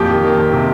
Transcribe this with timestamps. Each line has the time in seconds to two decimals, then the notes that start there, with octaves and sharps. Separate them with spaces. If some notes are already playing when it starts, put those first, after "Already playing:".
Already playing: F2 A#2 G4
0.08 D#3
0.23 D#3
0.38 F2
0.53 C3